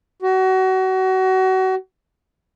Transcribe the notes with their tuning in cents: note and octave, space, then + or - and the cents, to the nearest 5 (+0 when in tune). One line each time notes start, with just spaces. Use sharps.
F#4 +30